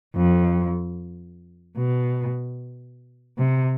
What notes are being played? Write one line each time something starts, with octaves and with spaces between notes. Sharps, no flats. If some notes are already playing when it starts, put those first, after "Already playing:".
F2
B2
C3